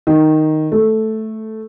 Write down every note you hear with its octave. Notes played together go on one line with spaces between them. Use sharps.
D#3
A3